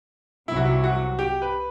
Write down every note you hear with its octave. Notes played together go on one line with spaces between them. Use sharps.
C2 C3 F#3 E4
F#4
E4
F#4
G4
B4